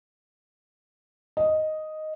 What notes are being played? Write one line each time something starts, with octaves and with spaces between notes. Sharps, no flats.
D#5